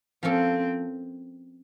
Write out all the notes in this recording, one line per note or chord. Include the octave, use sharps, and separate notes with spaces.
F3 A#3 C4 C#4 F4 A4